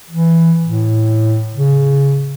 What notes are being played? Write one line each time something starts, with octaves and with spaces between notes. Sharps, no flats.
E3
A2
C#3